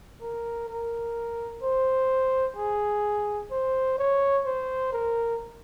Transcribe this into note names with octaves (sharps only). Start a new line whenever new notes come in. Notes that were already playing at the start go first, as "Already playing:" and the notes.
A#4
A#4
C5
G#4
C5
C#5
C5
A#4